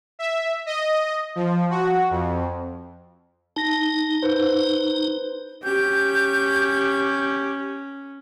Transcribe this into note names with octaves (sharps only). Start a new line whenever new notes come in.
E5
D#5
F3
F#4
F2
D#4 A5 A#6
B4 C5
C#4 G4 G6